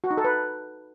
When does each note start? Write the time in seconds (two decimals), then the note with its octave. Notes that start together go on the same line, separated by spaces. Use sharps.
0.04 F#4
0.11 D#4
0.18 A4
0.24 B4